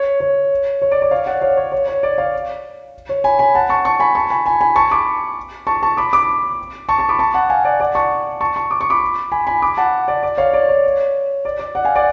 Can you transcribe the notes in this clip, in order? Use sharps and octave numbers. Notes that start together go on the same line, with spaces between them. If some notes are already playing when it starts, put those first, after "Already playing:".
Already playing: C#5
C#5
C#5
D5
D5
C#5 F5
D5 F#5
C#5 F5
C#5
C#5
C#5
D5
C#5 F5
C#5
G#5 B5
G#5 B5
F#5 A5
A5 C#6
A5 C#6
G#5 B5
A5 C#6
G#5 B5
G#5 B5
G#5 B5
A5 C#6
B5 D6
A5 C#6
A5 C#6
B5 D6
B5 D6
A5 C#6
A5 C#6
B5 D6
A5 C#6
F#5 A5
F5 G#5
D5 F#5
D5 F#5
A5 C#6
A5 C#6
A5 C#6
D6
C#6
B5 D6
G#5 B5
G#5 B5
B5 D6
F#5 A5
D5
D5
C#5 F5
D5
C#5
D5
D5
D5 F#5
F5 G#5
D5 F#5